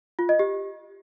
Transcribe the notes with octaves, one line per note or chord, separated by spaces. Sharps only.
F4
D#5
G4